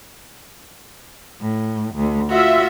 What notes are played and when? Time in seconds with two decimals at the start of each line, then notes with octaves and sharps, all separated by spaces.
1.41 A2
1.95 D2
2.29 F4 F#4 E5